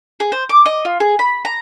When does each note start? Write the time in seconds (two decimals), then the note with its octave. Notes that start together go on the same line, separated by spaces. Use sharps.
0.20 G#4
0.32 C5
0.49 D6
0.66 D#5
0.85 F4
1.00 G#4
1.19 B5
1.45 A#5